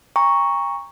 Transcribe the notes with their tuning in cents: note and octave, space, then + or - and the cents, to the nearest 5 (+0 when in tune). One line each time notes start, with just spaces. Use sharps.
G5 +45 A#5 +0 C#6 +0